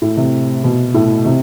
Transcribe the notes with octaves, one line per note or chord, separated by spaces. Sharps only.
A2
C3
B2
A2
C3